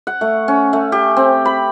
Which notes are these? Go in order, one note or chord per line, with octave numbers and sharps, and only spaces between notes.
F#5
A3
C#4
A3
G4
C4
B5